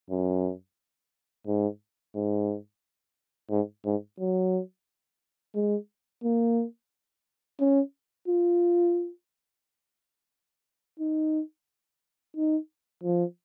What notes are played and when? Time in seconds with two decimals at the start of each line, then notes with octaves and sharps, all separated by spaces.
0.11 F#2
1.46 G#2
2.15 G#2
3.50 G#2
3.85 G#2
4.19 F#3
5.55 G#3
6.23 A#3
7.60 C#4
8.28 F4
11.00 D#4
12.36 D#4
13.04 F3